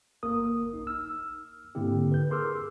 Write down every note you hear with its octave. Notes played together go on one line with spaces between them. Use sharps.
G1 A#3 A#4 D#6
B1 D#4
E6 F6
G#2 D3 A#3 C4 E4 G4
B4 G6
G#4 A#4 C6 D6 E6 F6